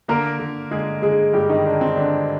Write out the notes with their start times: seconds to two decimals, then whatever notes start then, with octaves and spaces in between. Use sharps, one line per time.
0.08 D3 A#3 A#4
0.39 D3
0.71 D3 G#3 G#4
1.02 D3 G#3 G#4
1.33 G2 G3 G4
1.49 D#3 D#4
1.65 D3 D4
1.81 C4
1.96 D3 D4